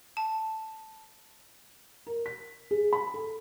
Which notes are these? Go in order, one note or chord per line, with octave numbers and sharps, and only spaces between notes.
A5
A#4
B6
G#4
B5
A4